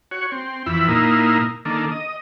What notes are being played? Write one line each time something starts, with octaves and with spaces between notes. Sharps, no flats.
F#4 C#5
C4
F2 E3 E4 B5
A#2 A#3 D#4 E4
D#3 A#3 D4 A4
D#5